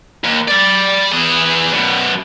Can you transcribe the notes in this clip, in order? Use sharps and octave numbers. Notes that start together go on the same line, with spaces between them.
D#2
D5 B5
E3 G#4
F#2 B2